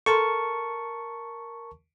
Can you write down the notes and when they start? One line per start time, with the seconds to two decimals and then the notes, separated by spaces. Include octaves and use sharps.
0.06 A4 A#4 A5 C6 C#6